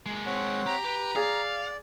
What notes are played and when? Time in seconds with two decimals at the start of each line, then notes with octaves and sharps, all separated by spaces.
0.06 G#3 A#3
0.26 C4 C#5 F#5
0.66 G4 A#5
0.85 G4 B4
1.16 G#4 D5 F5